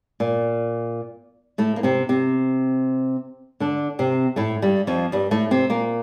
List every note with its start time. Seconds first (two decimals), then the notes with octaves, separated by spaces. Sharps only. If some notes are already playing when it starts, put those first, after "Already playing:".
0.20 A#2
1.58 A2 A3
1.76 A#3
1.83 C3 C4
2.09 C3 C4
3.60 D3 D4
3.99 C3 C4
4.36 A2 A3
4.62 G2 G3
4.87 F2 F3
5.12 G2 G3
5.31 A2 A3
5.51 C3 C4
5.70 A#2 A#3